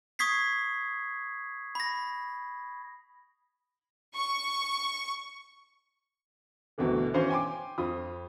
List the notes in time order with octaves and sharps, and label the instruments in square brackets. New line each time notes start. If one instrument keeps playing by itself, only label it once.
[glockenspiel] C#6 D#6 G#6 B6 C7
B5 A#6
[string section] C#6
[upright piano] G1 D2 B2 D3 E3 A4
B2 E3 C#4 C5 F5
G5 G#5 B5 C6 D6
F2 F4 B5 D#6